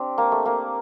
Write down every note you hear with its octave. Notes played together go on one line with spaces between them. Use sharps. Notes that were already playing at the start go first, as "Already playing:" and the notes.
Already playing: C4 D4 G4
A#3
A3
A#3